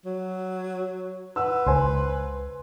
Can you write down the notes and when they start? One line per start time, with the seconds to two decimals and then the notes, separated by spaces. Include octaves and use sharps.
0.05 F#3
1.36 B4 F#5 E6
1.66 C#2 C5 G#5 C6